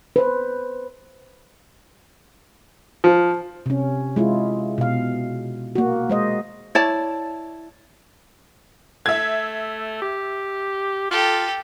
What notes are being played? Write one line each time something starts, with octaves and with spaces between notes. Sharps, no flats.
B4 C5
F3
C3 C#4
G#3 E4 F4
B2 F5
A#3 F#4
G#3 C5 D#5
E4 C#5 D5 A5
A3 E5 G#6
G4
F4 G4 A4